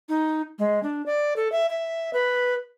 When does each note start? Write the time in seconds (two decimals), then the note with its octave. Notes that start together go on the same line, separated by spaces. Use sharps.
0.09 D#4
0.59 G#3
0.83 D4
1.06 D5
1.36 A4
1.52 E5
1.69 E5
2.13 B4